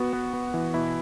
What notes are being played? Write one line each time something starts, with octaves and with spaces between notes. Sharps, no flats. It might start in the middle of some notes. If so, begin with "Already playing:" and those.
Already playing: B3 F#4
B3
B3
E3
B2 E4